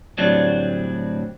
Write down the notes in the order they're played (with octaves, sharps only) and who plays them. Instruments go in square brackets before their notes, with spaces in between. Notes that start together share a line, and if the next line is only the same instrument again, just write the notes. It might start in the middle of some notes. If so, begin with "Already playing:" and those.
[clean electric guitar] D2 A2 F#3 G3 C4 D4